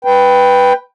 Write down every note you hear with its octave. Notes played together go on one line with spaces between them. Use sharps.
B4 G5